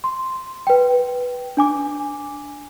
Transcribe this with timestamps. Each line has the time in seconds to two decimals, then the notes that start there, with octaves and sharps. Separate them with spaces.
0.04 C6
0.67 B4 G5
1.57 D4 G#5 D6